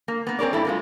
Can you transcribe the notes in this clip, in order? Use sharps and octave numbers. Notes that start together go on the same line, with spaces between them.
A#3
A#3 B3
C4 G#4 A#4 C#5 D5
G2 E4 A4
F#3 G#3 F4